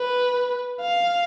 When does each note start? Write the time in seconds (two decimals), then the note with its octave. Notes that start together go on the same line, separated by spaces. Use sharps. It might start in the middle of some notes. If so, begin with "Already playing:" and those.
Already playing: B4
0.81 F5